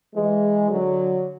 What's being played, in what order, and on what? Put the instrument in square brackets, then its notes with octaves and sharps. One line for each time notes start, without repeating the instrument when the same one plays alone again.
[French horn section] E3 G#3
D3 F#3